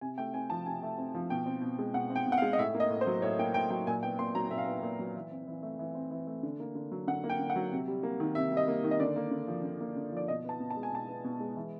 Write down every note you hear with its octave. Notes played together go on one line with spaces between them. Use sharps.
C3 G#5
A3 G5
C4 G#5
F3 A5
C3 G#5
A3
C4
F3
B2 G5
C4
B2
G#3
B2 F#5
C4
G5
B2
F#5
F5
G#3
D#5
A2 E5
A#3
D#5
A2
C5
F#3
A2 C#5
A#3 G5
A2 G5
F#3 G5
A#2 G#5
B3 G5
A#2 C6
F#3 A#5
A#2 E5
F5
B3 E5
A#2
F#3
E3
C4
E3
A3
E3
C4
E3
A3
D3
A#3
D3
F#3
D3 F#5
A#3
G5
D3
F#5
F#3
C3
G3
A#3
D#3
C3 E5
G3
D#5
A#3
D#3
D#5
D3 D5
A#3
D3
F3
D3
A#3
D3
F3 D5
B2 D#5
B3 A5
B2
A5
G#3
G#5
B2 A5
B3
B2
G#3
E3